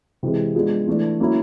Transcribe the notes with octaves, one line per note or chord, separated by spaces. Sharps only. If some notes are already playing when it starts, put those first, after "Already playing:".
C3 E3 G#3
F3 G#3 B3 D4
E3 A3 D4
F#3 A#3 C#4 E4